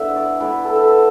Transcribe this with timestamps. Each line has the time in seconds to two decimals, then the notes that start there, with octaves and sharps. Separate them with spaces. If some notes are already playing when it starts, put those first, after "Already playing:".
Already playing: D3 B3 E4 E5 F#5
0.16 D5
0.40 E3 B3 E4 B4
0.52 B4
0.64 A4
0.76 A4
0.88 B4